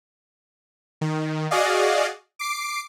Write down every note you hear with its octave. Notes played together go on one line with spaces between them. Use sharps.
D#3
F#4 G#4 D5 D#5 F5
D6 C7 D7